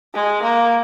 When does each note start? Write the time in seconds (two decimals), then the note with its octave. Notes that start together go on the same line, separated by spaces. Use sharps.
0.14 G#3
0.42 A#3